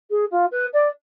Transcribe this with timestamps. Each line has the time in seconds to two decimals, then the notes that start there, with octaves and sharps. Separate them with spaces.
0.10 G#4
0.31 F4
0.51 B4
0.73 D5